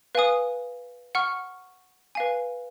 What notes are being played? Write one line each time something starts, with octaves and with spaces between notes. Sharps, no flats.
B4 F5 G#5 D#6
F#5 C#6 F6
B4 F5 G#5